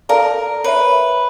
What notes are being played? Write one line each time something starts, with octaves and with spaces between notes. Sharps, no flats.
A4 A#4 D5 F5 A5
A#4 B4 C#5 E5